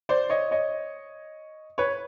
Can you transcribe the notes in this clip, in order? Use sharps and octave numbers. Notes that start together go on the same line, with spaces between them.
C5 D5
C#5 D#5
C#5 D#5
B4 C#5